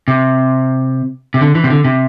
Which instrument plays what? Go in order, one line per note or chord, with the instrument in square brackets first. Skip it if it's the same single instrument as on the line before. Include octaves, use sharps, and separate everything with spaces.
[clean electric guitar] C3
C3
D3
E3
C3
D3
C3